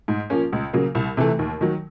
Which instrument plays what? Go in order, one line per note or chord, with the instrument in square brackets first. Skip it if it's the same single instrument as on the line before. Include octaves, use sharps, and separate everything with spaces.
[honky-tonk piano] G#2
F3 A#3 C#4
C#2
C#3 F#3 A#3
C2
C3 E3 A3
D#2
D#3 F#3